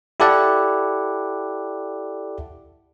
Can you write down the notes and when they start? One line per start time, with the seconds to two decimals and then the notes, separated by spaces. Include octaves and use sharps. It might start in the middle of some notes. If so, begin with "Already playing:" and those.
0.20 E4 G4 A4 D5 F#5